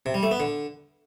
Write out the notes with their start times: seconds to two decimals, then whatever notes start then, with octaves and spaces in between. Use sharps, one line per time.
0.06 C3
0.14 G3
0.23 A3
0.31 B3
0.40 D3